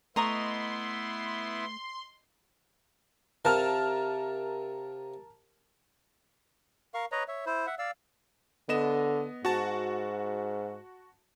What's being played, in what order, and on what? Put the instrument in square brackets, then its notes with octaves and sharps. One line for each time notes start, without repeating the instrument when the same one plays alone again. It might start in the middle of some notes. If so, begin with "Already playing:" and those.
[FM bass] A3 [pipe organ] B3 E4 [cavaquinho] D#5 A#5 C#6 [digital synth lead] C6
[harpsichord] C3 F5 [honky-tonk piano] A#4 A5 F6
[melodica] A#4 F5 C#6
B4 C#5 D#5 A#5
C#5 E5
E4 C5
E5 F#5
D5 F5 E6
[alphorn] D3 [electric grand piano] B3 D#5 E7
[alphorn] G#2 [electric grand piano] F#4 A5